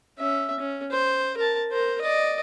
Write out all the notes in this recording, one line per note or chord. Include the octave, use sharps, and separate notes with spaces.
C#4 E5
C#4
C5
A#4 A5
A#4 C5
D5 D#5